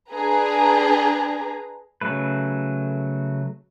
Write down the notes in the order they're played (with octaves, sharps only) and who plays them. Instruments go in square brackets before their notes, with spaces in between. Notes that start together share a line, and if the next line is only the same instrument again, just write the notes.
[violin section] D4 G#4 B4 A#5
[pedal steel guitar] C#3 F#3 A3 B4